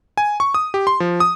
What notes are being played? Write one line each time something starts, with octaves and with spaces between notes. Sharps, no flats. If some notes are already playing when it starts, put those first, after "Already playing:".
G#5
C#6
D#6
G4
C6
F3
D#6